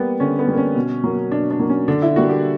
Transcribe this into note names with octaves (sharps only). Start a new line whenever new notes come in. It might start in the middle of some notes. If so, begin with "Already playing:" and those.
Already playing: G3 A#3 B3
D3 C#4
B3
G3 A#3
C#4
B2
F#3 A#3
B2 D4
D4
F#3 A#3
C#4
D3 D4
E4
G3 A#3 F#4
G4